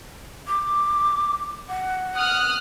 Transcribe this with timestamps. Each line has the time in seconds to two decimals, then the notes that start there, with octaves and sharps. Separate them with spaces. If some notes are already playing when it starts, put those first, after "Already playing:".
0.48 D6
1.69 F#5
2.16 D#6 F6 F#6